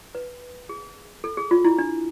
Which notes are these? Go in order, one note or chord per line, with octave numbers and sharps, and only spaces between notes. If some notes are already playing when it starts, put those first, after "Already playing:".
B4
G#4
A4
G#4
F4
E4
D4